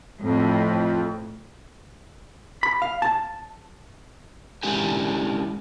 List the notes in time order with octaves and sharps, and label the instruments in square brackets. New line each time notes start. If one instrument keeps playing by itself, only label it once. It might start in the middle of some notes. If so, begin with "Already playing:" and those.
[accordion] F2 [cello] A2
[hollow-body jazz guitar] B5
F5
A5
[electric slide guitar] G#3 C#4 D4 E4 G4 G#5